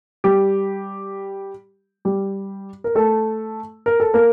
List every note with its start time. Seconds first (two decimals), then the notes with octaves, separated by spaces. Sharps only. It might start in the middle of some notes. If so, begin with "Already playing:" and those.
0.24 G3 G4
2.05 G3 G4
2.84 A#4
2.95 A3 A4
3.86 A#4
4.00 A4
4.14 A#3 A#4